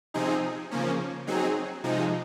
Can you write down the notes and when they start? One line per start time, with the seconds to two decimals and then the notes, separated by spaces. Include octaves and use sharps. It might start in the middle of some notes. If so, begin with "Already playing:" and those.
0.14 C3 F3 C4 D#4 G#4
0.71 C#3 F3 A#3 C#4
1.27 F#3 C4 D#4 G#4
1.84 C3 F3 G#3 D#4